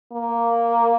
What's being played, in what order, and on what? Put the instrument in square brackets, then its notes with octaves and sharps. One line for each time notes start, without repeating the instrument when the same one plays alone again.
[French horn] A#3